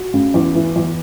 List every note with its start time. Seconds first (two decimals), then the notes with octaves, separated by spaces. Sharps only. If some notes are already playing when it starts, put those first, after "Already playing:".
Already playing: F#4
0.14 C#3
0.34 E2
0.55 E3
0.76 E2